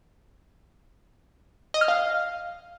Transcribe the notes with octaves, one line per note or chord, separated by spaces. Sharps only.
D#5
F6
F5